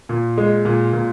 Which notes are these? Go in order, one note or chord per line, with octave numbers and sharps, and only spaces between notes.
A#2
G#3
A#2
A#2